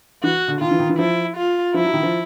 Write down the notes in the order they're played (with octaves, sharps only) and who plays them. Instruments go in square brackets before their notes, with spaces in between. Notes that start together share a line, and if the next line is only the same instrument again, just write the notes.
[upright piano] E3 [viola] F#4
[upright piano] D3
[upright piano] D#3 [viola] F4
[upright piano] E3
D#3
E3
[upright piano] F3 [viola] E4
[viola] F4
[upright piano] F3 [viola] E4
[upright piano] F#3
D#3
F3